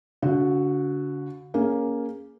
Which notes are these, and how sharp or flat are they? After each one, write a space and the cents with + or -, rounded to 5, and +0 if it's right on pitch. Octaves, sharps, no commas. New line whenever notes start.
D3 -40 F#4 +0
A#3 +5 C#4 +10 G#4 +0